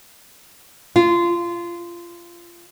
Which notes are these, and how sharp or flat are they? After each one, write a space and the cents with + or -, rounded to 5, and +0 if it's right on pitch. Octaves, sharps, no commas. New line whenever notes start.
F4 -20